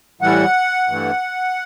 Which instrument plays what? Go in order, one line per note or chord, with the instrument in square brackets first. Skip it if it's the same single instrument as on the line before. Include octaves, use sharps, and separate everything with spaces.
[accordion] A2 E3 G3 F#5
G2 E3 A3